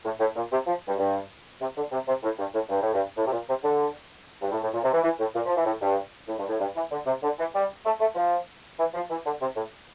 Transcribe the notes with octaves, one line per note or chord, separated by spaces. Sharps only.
A2
A2
A#2
C3
F3
G2
G2
C3
D3
C3
C3
A2
G2
A2
G2
A2
G2
A2
C3
A#2
C3
D3
G2
A2
A2
A#2
C3
E3
E3
A2
A#2
F3
E3
A2
G2
A2
G2
A2
G2
E3
D3
C3
D3
E3
G3
A3
A3
F3
E3
F3
E3
D3
C3
A2